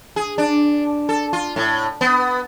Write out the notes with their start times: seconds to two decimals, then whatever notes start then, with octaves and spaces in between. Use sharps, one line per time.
0.16 G#4
0.38 D4
1.09 A4
1.33 F4
1.56 A2
2.01 B3